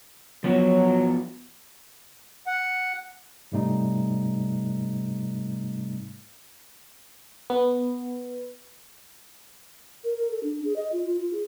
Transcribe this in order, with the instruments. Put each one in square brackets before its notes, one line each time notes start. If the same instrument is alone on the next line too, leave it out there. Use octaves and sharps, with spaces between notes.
[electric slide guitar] F3 B3 F#4 [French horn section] F#3
[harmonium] F#5
[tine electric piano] G#2 C3 G3 A3 C4 D#4
[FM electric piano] B3
[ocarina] A#4
A#4
A4
D4
G#4
D#5
F4
F4
F4
G#4